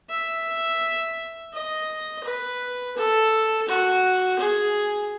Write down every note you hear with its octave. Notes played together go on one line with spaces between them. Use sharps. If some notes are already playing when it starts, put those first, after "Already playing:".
E5
D#5
B4
A4
F#4
G#4